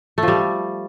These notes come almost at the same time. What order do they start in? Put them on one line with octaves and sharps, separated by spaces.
A3 F3 G3